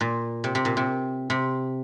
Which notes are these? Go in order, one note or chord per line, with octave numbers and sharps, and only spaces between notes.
A#2
C3
C3
A#2
C3
C3